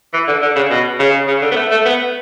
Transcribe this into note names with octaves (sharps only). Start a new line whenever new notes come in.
E3
D3
D3
C#3
B2
C#3
C#3
D3
B3
A3
A3
B3